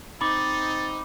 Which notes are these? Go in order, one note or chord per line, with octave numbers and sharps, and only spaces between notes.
C4 D#4 B5 D6 A6